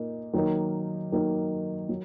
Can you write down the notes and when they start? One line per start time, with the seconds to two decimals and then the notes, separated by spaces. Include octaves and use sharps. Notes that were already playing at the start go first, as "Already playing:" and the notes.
Already playing: A#2 A#3 D#4
0.33 D#3 F#3 A#3 D#4
1.12 D#3 F#3 A#3 D#4
1.89 F#3